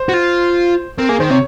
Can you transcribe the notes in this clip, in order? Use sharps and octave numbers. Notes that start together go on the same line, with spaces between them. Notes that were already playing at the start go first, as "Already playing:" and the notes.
Already playing: C5
F#4
F4
C4 A#4
A#3 G#4
D#3 C5
C3 C#5